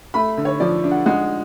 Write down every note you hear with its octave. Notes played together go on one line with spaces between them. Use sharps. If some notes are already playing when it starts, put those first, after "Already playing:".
A3 B5
D3
C#5
F3 D5
D4
F#5
G#3 F#5